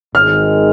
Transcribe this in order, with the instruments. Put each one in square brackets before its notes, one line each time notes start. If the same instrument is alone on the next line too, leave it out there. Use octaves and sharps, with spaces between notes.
[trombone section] G#1 G#2 D#3 G#3 [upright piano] F6